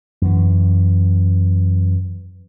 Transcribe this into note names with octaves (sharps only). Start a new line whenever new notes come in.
F#2 E3